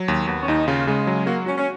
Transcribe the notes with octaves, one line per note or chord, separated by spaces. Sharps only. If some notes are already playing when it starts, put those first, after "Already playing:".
Already playing: F#3
D#2
D#2 B3
C#4
D#2 D#4
C#3 F4
C#3 G#3
F#3
A#3 F#4
C#4 F#4
C#4